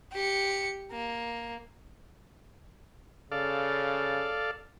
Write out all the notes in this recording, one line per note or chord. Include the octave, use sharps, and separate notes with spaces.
G4 C#7
A#3
C#3 A4 D5 F5